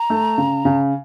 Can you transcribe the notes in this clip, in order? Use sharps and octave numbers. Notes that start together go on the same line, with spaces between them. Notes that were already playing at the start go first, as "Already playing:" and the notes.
Already playing: A#5
A3
C#3
C#3